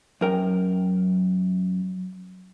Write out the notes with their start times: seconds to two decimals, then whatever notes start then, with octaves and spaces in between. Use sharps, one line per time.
0.21 F#2 A#4 G5